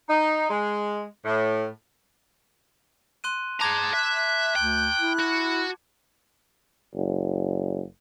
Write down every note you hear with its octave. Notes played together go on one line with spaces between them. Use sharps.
D#4
G#3
A2
C6 F#6 D#7
G#4 A5 A#5 D6 G#6
E5 F#6
D2 G5
E4
F#4
F#1